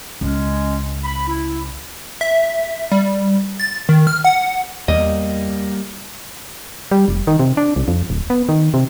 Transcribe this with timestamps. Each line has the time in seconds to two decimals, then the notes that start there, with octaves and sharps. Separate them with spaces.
0.21 C#2 G#3 C#4
1.03 B5
1.27 E4
2.21 E5
2.92 G3
3.60 A6
3.89 D#3
4.07 F6
4.25 F#5
4.88 E2 G3 A#3 D#5
6.91 G3
7.08 F1
7.27 D#3
7.39 C3
7.57 D4
7.76 C2
7.88 F2
8.10 D1
8.30 B3
8.49 D#3
8.74 C3